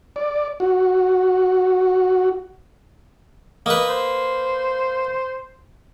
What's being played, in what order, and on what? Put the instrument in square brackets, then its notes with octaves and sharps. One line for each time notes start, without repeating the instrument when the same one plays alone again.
[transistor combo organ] D5
F#4
[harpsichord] A#3 B4 [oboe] D#5
[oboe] C5